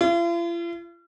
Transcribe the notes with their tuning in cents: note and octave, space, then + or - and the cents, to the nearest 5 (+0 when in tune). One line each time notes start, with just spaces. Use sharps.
F4 -45